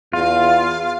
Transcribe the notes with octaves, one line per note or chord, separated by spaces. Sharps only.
E2 F4 F5